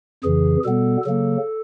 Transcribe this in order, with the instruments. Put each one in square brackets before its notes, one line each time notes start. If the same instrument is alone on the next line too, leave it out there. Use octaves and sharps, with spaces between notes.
[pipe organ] F2 C#3 E3 G#4
B2 G3 B3 A4
C#3 F#3 A#3 A4